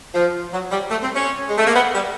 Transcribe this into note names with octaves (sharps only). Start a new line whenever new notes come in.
F3
F#3
G3
A3
C4
C#4
G#3
A3
A#3
B3
G3